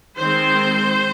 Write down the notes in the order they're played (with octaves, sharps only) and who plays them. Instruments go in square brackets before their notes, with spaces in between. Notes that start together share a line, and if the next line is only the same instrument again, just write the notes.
[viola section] D#3 G#3 C4 C5